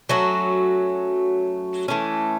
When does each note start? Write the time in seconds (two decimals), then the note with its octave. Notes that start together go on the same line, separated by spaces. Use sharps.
0.09 F#3 A3 C#4 F#4
1.88 E3 A3 C#4